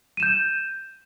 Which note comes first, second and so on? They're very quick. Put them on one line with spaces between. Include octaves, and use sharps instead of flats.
D#7 E7 G6